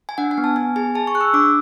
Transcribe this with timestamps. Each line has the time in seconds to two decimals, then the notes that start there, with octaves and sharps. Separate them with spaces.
0.09 G#5
0.18 D4 F#5
0.31 G#5
0.38 B3
0.44 A5
0.56 B3 G#5
0.76 G#4 G#5
0.95 G#4 A5
1.07 C#6
1.15 G#4 F#6
1.21 E6
1.33 D4 D6